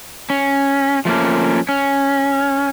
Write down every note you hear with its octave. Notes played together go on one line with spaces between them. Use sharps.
C#4
F3 A3 A#3 C#4
C#4